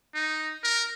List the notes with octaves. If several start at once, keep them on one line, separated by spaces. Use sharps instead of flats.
D#4
A#4